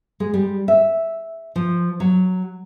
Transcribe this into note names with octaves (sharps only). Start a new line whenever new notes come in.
G#3
G3
E5
F3
F#3